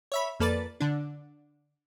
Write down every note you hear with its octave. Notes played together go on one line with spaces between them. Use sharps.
C#5 E5 B5
F2 A#3 A4 B4 D5 A6
D3 D4